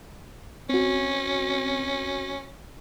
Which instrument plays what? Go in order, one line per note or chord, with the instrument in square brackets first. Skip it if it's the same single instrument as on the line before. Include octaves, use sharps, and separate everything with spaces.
[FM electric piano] C4 F#4 [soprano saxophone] C#4